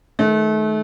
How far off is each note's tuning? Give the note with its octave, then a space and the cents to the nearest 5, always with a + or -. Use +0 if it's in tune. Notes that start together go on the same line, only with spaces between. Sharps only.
D#3 -5 A3 -35